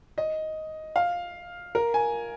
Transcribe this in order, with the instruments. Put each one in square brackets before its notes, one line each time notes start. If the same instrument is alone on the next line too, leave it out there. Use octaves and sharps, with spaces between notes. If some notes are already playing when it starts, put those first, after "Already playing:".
[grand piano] D#5
F5
A#4
G#5